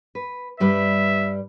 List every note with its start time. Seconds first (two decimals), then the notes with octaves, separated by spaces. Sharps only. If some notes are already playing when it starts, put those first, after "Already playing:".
0.15 B4
0.60 G2 G3 B4 E5